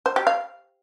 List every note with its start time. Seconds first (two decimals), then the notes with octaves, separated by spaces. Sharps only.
0.06 C5
0.16 G4
0.27 F5